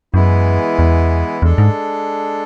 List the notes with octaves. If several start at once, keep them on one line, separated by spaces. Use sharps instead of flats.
F#2 E3 G#3 B3 E4
E2
E2 G#3 D4 A4
G#2